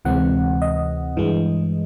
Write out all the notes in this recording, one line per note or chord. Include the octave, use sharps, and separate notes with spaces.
D2 C3 E3 G#3 C4 F#5
D#5
G2 E3 G#3